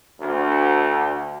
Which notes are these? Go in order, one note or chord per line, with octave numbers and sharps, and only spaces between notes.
D2